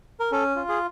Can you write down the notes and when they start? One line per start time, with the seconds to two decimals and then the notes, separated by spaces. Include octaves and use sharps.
0.20 A#4
0.32 C#4 A4
0.56 F4
0.69 G#4